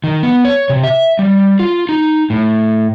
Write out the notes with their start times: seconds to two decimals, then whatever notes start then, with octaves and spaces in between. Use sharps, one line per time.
0.04 D#3
0.23 B3
0.45 C#5
0.69 C3
0.83 E5
1.19 G3
1.60 F4
1.89 D#4
2.30 A2